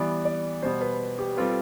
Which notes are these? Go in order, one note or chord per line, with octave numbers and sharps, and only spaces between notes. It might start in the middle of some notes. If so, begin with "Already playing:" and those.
Already playing: E3 G3 B3 D5
D5
B2 G3 B3 C5
B4
G4
G3 C4 F4 A4 B4